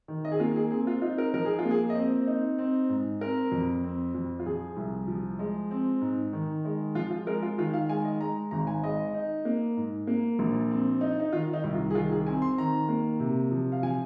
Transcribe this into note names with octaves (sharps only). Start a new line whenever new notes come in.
D#3
D#5
G#4
A#3 F4
G#4
C4 G#4
F4
D#4 F4
A#4
F3 A#4
G#4
F4
A#3
G#4
D#5
C4 C5
D#4
C4
G#2
C4 A#4
F2
C4
F2
F4
F3 G#4
C2
F3
G#3
C4
G#2
D#3
G#3
F3 F4
F4
G#3 A#4
F4
D#3 F4
F5
G#3 G#5
D#5
G#3 A#5
G#1 A#5
G#5
G#3 D#5
D#4
A#3
G#2
A#3
A#1
C4
D#4
D#4
D#3 F4
D#4
C2
F4
G#4
D#3 F4
G#4
C4 G#5
C6
D#3 A#5
A#3
C3
F3
F5
F3 G#5